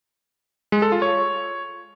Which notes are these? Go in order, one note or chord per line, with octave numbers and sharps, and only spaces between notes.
G#3
A4
F4
C#5